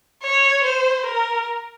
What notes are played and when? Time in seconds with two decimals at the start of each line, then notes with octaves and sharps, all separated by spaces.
0.23 C#5
0.64 C5
1.06 A#4